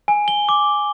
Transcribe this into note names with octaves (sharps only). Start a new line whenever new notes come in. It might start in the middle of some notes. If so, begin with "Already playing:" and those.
G#5
G7
D6